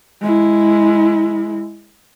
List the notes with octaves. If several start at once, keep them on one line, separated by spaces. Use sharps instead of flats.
G#3 E4